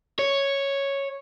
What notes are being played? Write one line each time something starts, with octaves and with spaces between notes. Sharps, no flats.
C#5